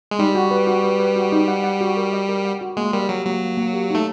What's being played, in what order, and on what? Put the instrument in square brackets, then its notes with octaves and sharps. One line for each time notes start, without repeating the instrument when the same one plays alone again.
[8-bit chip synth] G#3
[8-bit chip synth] G3 [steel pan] D#4
[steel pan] F#4
B4
F#4
B4
B4
F#4
D#4
F#5
F#5
F#4
A#4
D#5
A#4
F#5
F#4
[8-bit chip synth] G#3 [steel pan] A#3
[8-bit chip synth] G3 [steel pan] A#4
[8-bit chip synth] F#3 [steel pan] G4
[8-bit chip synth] F#3 [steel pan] A#3
[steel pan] A#3
A#3
G4
[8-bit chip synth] A3 [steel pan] D#4